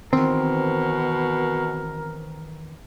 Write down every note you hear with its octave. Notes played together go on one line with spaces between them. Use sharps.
B2 D#3 E3 C4 A#4